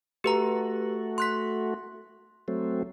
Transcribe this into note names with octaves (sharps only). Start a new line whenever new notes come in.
A3 F#4 G4 B4 A#5
C6 F#6 B6
F#3 A3 C4